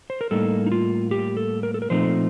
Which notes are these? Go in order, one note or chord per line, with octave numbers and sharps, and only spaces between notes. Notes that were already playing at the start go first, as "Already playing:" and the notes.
C5
A#4
A2 G3 A#3 D#4 A4
D#4
F4
G4
A4
A#4
A4
A#4
A#2 F3 A3 C4 D#4 C5